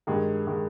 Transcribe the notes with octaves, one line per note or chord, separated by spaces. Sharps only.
G2 D#3 G#3
D#3 G#3